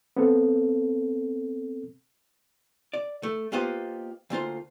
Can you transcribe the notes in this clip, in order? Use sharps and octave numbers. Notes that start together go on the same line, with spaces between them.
B3 C4 A4
D5
A3
A#3 B3 F4 G4 C5 D#5
D2 A#3 F4 C5